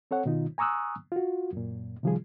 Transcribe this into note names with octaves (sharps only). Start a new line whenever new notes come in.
C4 A4 C#5 F#5
B2 D#3 D#4 F4
G#5 A#5 C#6 D#6 E6 F#6
F4 F#4
F#2 A#2
C3 D#3 F3 G3 F4 G#4